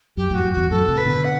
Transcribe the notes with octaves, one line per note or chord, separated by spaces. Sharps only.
F#2 G4
F#2 A2 F#4
F#2
E2 G2 F#4
F#2 A2 A4
A2 C3
B4
B2 D3
F#5